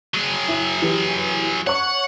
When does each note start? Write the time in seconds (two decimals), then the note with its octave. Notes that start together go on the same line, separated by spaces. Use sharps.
0.14 F#3 G#4
0.48 E4
0.82 E3 G4
1.67 C#5 F#5 C#6